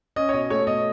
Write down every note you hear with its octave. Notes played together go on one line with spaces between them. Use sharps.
C#4 D#5
C#5
B2 D#5
A3 C#5
B2 D#5